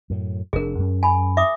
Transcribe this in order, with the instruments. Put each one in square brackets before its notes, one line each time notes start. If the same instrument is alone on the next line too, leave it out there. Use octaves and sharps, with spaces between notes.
[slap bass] F#2 A2
[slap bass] F1 D4 [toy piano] G#4 A#4
[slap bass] F#2 C#4
[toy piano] G#5 B5
E5 D6 D#6